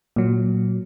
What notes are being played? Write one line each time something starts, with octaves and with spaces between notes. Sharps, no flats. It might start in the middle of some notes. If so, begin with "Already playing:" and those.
A#2 F#3